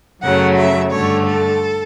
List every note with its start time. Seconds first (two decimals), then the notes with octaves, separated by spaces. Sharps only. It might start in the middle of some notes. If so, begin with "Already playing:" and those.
0.22 F#2 C#3 F#3 A3 F#5
0.57 E5
0.92 G2 D3 A3 C#5
1.27 A4